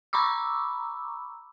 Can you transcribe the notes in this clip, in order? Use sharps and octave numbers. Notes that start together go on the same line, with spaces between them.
A#5 B5 C#6 D6 E6